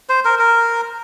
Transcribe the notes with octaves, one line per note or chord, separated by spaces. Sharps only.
C5
A#4
A#4